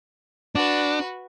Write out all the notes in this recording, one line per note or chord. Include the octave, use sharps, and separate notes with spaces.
D4 F#4 B4